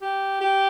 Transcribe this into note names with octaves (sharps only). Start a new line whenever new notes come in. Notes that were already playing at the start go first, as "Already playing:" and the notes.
G4
G4